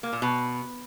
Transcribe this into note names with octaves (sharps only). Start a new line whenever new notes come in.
A#3
A#2
B2